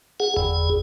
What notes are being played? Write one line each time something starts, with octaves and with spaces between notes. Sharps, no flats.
G#4 F#5
G1 E2 G#4